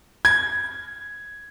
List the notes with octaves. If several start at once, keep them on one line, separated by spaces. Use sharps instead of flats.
G#6